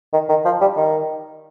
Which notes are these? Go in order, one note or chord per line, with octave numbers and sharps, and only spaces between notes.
D#3
D#3
F3
G3
D#3